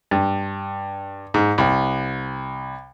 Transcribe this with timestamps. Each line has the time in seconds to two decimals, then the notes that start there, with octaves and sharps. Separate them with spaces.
0.11 G2
1.34 G#2
1.58 C2